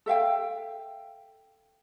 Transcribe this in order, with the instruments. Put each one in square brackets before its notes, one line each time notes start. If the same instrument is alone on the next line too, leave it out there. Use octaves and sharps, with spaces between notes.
[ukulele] A4 E5 F5 G5